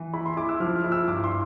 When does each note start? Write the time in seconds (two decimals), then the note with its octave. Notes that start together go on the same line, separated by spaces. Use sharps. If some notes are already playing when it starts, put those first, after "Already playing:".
Already playing: E3
0.14 E4 B5
0.26 C6
0.37 E4 D6
0.49 E6
0.60 F3 F6
0.76 F6
0.84 E4
0.92 E6
1.08 G2 D6
1.24 C6